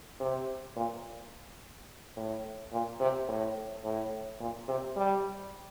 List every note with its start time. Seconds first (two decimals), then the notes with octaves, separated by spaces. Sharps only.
0.20 C3
0.76 A#2
2.17 A2
2.72 A#2
3.00 C3
3.28 A2
3.85 A2
4.40 A#2
4.68 C3
4.96 G3